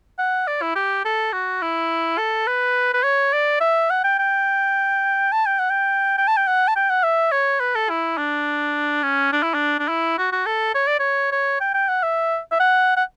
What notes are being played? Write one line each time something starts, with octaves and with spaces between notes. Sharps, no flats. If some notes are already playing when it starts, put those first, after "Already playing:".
F#5
D5
E4
G4
A4
F#4
E4
A4
B4
B4
C#5
D5
E5
F#5
G5
G5
A5
G5
F#5
G5
G5
A5
G5
F#5
A5
G5
F#5
E5
C#5
B4
A4
E4
D4
C#4
D4
E4
D4
D4
E4
F#4
F#4
A4
C#5
D5
C#5
C#5
G5
G5
F#5
E5
E5
F#5
F#5